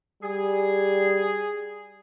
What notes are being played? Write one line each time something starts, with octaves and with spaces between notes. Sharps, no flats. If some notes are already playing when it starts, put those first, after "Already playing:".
G3 G#4